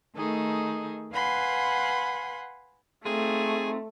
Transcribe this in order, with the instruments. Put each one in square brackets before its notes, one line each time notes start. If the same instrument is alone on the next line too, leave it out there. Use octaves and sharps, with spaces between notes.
[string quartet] D#3 A3 D#4 G#4 A4
B4 F5 F#5 G#5 B5 C6
[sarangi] A3 [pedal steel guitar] C4 D#4 F4 [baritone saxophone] G#4